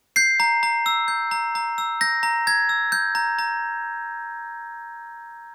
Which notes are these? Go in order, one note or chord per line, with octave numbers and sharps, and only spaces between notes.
G6 C7
A#5
A#5
E6
G6
A#5
A#5
E6
G6 A#6
A#5
A#5 G#6
E6
G6
A#5
A#5